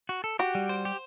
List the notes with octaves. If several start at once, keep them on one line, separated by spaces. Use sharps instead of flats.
F#4
A4
F#4 G4
G3
C5
G4